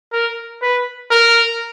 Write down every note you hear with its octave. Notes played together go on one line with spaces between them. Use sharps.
A#4
B4
A#4